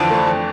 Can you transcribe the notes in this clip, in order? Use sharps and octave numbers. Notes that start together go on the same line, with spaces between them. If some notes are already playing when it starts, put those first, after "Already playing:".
Already playing: F2 D3 E3 F3 D4
A3
F2